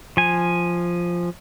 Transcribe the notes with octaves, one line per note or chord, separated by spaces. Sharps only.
F3 G#5